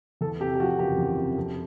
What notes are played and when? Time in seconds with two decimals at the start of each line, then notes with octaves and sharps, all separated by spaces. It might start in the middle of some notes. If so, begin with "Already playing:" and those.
0.21 E2 A4
0.40 C3 G4
0.55 G4
0.60 F3 F#4
0.79 F#1 G4
0.98 E2
1.17 C3
1.37 F2